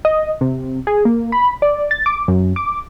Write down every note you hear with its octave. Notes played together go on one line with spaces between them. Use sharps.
D#5
C3
G#4
A#3
B5
D5
A6
D6
F#2
D6